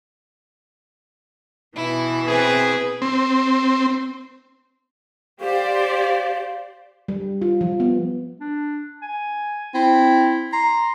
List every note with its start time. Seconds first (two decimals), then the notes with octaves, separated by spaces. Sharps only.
1.76 B2 E3 E4
2.27 C4 G#4 B4
3.02 C4
5.41 G4 C5 D5 F5
7.08 G3
7.42 F4
7.61 F3
7.80 B3
8.40 D4
9.02 G#5
9.75 C4 E4
10.53 A#5 C6